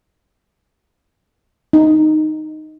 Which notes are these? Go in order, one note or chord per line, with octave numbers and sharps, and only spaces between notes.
D#4